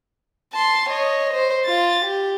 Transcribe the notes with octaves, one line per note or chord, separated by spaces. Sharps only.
A5 C6
C#5 D#5
C5
F4 A6
G4